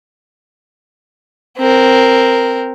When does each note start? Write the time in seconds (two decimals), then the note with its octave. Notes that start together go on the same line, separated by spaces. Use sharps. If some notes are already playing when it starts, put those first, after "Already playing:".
1.58 C4 A#4